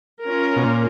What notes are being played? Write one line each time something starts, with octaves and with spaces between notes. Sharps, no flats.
C#4 F4 A#4
B2
A#2